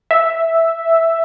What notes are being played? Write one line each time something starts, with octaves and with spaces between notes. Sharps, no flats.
E5